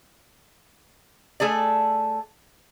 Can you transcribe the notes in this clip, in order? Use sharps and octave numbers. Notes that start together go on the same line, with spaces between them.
A3 G#4 A4 D5